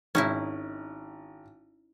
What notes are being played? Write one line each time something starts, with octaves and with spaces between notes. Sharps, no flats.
G#1 D#3 C#4 D#4 E4